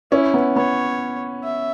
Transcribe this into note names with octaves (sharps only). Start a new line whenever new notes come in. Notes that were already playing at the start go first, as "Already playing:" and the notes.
C#4 E4
B3
B3 C#5
E5